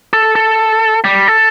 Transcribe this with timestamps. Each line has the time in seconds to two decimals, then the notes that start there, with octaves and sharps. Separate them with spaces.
0.13 A4
0.36 A4
1.04 G3
1.28 A4